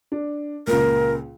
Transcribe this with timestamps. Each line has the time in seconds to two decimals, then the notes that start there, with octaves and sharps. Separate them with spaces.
0.12 D4
0.67 C#2 A#2 A#4